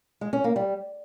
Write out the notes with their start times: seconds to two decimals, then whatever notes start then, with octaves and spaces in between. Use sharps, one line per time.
0.21 G#3
0.33 C#4
0.44 A#3
0.56 G3